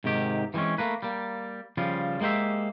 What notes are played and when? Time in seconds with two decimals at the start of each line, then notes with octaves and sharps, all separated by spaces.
0.04 G#2 C3 D#3 G4
0.54 E3 G3 G#3 C4 C#4
0.78 A3 A#3 B4
1.03 G3 A#3
1.77 C#3 F3 G3 F4
2.21 G#3 A#3 G4 C5 E5